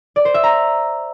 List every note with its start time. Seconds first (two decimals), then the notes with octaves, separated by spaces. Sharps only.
0.16 D5
0.25 C5
0.34 E5
0.44 A#5